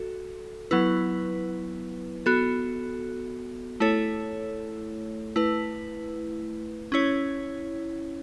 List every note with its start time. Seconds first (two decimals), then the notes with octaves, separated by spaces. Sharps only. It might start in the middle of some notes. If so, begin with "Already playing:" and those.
Already playing: F#4 A4
0.71 F#3 B3 E4 B4
2.26 B3 F#4 A4
3.80 A3 E4 A4 C#5
5.36 A3 E4 B4
6.92 C#4 E4 C#5